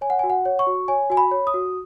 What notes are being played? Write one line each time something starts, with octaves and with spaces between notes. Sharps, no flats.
C#5 G#5
F#5
F#4 G#5
F#5
C#5
C#6
F#4
C#5 G#5
F#4 G#5
B5
C#5
D#6
F#4